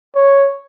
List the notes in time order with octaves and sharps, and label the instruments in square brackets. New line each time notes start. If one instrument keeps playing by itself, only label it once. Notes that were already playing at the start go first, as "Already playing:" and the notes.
[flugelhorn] C#5